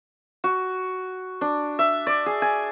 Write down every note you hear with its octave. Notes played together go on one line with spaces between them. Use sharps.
F#4
D4
E5
D5
G#4
G#5